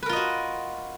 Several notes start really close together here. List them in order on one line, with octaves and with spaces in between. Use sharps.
B4 A#4 F4 D#5 F#4